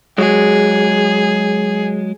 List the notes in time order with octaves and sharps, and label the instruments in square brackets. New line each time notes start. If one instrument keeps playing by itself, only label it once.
[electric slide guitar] F#3 G#3 [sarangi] G#4